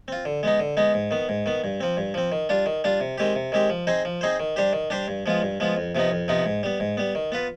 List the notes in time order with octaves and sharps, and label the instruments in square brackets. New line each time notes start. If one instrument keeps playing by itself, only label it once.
[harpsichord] C4 F4
D3
G#3 B3 D#4
D3
G#3 B3 D#4
G#2
D#3 B3
G#2
D#3 B3
G2
F3 C4
G2
F3 C4
D#3
G3 D4 F4
D#3
G3 D4 F4
C3
D#3 G#3 C4 G4
C3
D#3 G#3 C4 G4
F3
C4 D#4 G#4 C5
F3
C4 D#4 G#4 C5
D#3
G3 D4 G4 C5
D#3
G3 D4 G4 C5
G2
F3 G#3 B3 F4
G2
F3 G#3 B3 F4
F2
C3 F3 B3 D#4
F2
C3 F3 B3 D#4
G#2
G3 B3
G#2
G3 B3
D#3
B3 F4 B4